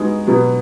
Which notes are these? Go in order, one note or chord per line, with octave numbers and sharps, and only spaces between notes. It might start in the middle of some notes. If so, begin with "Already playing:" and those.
Already playing: G#3 B3 D#4 F#4
B2 F#3 B3